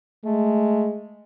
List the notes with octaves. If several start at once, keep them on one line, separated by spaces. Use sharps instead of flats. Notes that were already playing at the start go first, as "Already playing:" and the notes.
G#3 A3